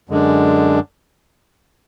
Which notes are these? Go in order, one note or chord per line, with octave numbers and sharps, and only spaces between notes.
F#2 D3 G#3 D4